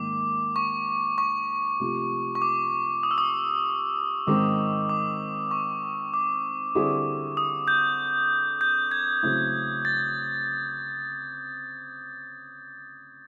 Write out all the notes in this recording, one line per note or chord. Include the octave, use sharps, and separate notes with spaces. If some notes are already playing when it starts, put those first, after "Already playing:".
Already playing: G#2 D#3 A#3 D6
C#6
C#6
C3 F3 A3
C#6
D6
D#6
E6
D#6
G#2 D#3 G#3 C4 D#4 D6
D6
C#6
D6
D3 G3 C4 E4 G#4
D#6
G6
G6
G#6
C#3 F#3 A3 C4 E4
A6